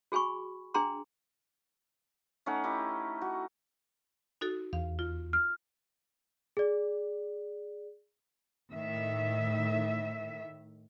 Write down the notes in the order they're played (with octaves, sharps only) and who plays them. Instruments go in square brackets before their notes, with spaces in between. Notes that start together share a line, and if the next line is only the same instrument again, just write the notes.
[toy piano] F#4 G#4 G#5 B5 C#6
D4 G#4 G5 A#5 C6
[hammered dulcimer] A3 C#4 D#4 F#5
D#4 E4 G4
F#4
[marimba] D#4 F#4 A4
[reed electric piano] E2 [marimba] F5
[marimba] F4
[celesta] F6
G#4 D5
[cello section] A2 D#3 E5